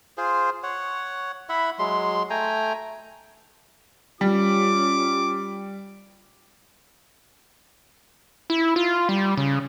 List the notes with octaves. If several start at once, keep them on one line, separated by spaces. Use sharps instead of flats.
F4 G#4 C5
C#5 F#5
E4 E5 F#5 B5
F#3 G#3 C6
A3 G5 G#5 A#5
G3 C#4 F4 G4 D6
E4
F4
G3
C#3